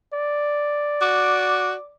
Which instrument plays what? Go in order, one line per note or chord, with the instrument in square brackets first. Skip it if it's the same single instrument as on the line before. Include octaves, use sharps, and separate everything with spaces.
[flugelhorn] D5
[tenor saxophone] F#4 [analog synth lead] D6